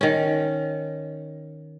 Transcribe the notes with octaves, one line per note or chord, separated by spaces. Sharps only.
D#3 C#4